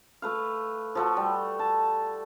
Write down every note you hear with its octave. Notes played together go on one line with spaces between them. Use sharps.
A3 B4 F5
F3 A3 F#4
G3
A5